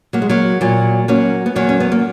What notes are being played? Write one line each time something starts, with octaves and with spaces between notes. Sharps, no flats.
F#3 A#3
G#3
F#3 A#3
A#2 F#3 A#3
F#3 A#3 C#4
B3
E2 F#3 A#3
C#4
B3
A#3